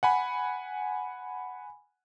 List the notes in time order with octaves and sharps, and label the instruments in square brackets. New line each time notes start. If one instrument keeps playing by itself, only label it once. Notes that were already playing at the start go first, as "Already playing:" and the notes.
[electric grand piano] F#5 G#5 B5